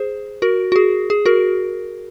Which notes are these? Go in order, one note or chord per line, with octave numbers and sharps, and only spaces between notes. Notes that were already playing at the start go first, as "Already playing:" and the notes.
Already playing: G#4 C5
F#4 A#4
F#4
G#4
G#4
F#4 A#4